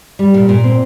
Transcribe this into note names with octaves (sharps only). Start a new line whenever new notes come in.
G3
A#2
A#2
C4